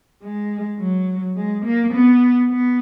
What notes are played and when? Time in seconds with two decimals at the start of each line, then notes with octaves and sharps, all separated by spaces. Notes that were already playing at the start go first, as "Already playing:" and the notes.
0.23 G#3
0.79 F#3
1.36 G#3
1.65 A#3
1.93 B3
2.50 B3